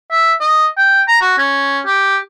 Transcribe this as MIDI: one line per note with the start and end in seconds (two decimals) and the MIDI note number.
0.11 0.33 76
0.41 0.66 75
0.78 1.02 79
1.08 1.16 82
1.21 1.33 66
1.38 1.80 61
1.86 2.18 67